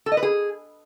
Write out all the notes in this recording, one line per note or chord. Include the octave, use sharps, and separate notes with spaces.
A4
D#5
B4
G#4